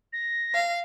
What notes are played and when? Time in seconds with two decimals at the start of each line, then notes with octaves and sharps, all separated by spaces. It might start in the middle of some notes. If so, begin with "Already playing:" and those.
0.13 A#6
0.53 F5